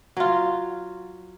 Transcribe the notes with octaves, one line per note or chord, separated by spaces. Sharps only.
F#3 F4